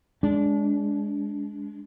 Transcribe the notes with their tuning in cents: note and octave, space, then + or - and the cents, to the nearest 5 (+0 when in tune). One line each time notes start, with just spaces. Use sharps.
G#3 +0 D4 -25